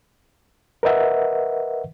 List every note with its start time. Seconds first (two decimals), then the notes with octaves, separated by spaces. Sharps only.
0.83 A#4 B4 D#5 E5 F#5